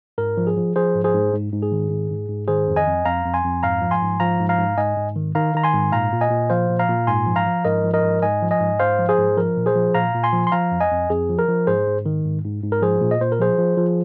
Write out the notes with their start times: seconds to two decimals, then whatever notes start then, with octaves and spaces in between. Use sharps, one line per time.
0.18 G#2 A#4
0.37 F3
0.47 G#4
0.57 F3
0.76 F3 G#4 C5
0.95 G#2
1.04 G#4 C5
1.14 G#2
1.33 G#2
1.52 G#2
1.62 G#4
1.72 D#3
1.90 G#2
2.10 G#2
2.29 G#2
2.48 D#3 G#4 C5
2.67 F2
2.76 D#5 G#5
2.87 F2
3.05 F2 F5 A#5
3.25 F2
3.34 G#5 C6
3.44 F2
3.63 G#2 F5 A#5
3.82 F3
3.91 G#5 C6
4.01 G#2
4.20 F3 F5 A#5
4.40 G#2
4.49 F5 A#5
4.58 G#2
4.77 G#2 D#5 G#5
4.97 G#2
5.16 D#3
5.35 D#3 F5 A#5
5.54 D#3 A#5
5.64 G#5 C6
5.73 G#2
5.92 A#2 F5 A#5
6.12 A#2
6.21 D#5 G#5
6.31 A#2
6.50 F3 C5 F5
6.70 A#2
6.79 F5 A#5
6.89 A#2
7.07 G#2 G#5 C6
7.26 F3
7.36 F5 A#5
7.46 F3
7.65 G#2 A#4 D#5
7.84 F3
7.94 A#4 D#5
8.03 G#2
8.22 G#2 D#5 G#5
8.42 F3
8.51 D#5 G#5
8.61 G#2
8.79 G#2 C5 F5
8.99 F3
9.09 G#4 C5
9.18 G#2
9.37 F3 A#4
9.57 A#2
9.66 G#4 C5
9.75 F3
9.95 A#2 F5 A#5
10.14 A#2
10.23 G#5 C6
10.33 F3
10.47 C6
10.52 F3 F5 A#5
10.71 F2
10.81 D#5 G#5
10.91 F2
11.10 F2 G#4
11.29 F3
11.39 A#4
11.48 F3
11.67 G#2 G#4 C5
11.87 G#2
12.06 D#3
12.25 G#2
12.45 G#2
12.63 G#2
12.72 A#4
12.82 F3 G#4 C5
13.01 A#2
13.11 D#5
13.21 A#2 C5
13.32 A#4
13.40 F3 G#4 C5
13.58 F3
13.77 F3